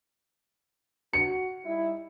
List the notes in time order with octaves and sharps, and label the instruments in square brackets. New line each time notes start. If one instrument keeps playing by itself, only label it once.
[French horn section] F#4 [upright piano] C#7
[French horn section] G3 D#4 E4